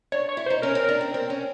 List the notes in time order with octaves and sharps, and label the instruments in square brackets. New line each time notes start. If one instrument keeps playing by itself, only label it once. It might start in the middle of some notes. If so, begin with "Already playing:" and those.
[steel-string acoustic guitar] D4 [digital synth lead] C#5
[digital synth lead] C#5
[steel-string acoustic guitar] E4
[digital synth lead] C5
[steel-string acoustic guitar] D#4
[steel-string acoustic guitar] C#4 [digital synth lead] A#4
[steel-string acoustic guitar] C4
D4
C4
C4
C#4